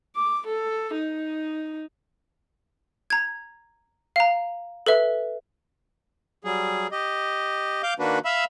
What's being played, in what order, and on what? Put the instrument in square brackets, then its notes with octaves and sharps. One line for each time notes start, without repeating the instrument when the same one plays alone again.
[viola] D6
A4
D#4
[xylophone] A#5 G#6
F5 A#5
A4 B4 E5
[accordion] F#3 G3 G#4
G4 D#5
F5 D6 G6
D#3 A#3 D4 F#4 B4
E5 F5 B5 E6